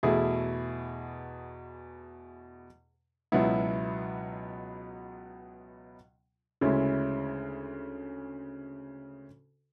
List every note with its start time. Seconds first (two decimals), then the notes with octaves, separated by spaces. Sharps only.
0.03 E2 B2 A3 E4 G#4
3.32 C#2 B2 F#3 B3 E4
6.61 D2 C#3 G#3 C#4 E4